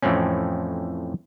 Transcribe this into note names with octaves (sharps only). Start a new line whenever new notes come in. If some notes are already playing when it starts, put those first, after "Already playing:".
F2 A2 E3 C4 C#4